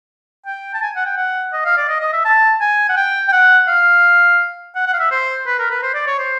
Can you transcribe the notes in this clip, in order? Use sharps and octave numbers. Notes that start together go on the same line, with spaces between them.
G5
A5
G#5
F#5
G5
F#5
D#5
F5
D5
D#5
D#5
E5
A5
G#5
F#5
G5
G5
F#5
F5
F#5
F#5
F5
E5
C5
B4
A#4
B4
C5
D5
C#5
C5